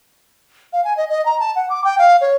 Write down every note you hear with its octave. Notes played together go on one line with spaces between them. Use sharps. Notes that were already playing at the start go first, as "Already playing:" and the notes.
F5
G#5
D#5
D#5
A#5
A5
F#5
D6
G5
F5
C#5